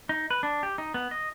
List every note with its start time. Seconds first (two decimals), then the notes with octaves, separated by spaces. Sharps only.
0.09 D#4
0.30 B4
0.43 D4
0.63 G4
0.78 D#4
0.94 B3
1.11 D#5